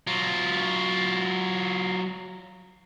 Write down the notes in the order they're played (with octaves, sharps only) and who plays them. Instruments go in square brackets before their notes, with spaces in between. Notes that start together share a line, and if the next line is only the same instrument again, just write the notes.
[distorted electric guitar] F#3 F4